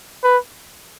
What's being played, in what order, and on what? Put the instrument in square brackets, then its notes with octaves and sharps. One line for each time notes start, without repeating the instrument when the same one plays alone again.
[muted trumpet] B4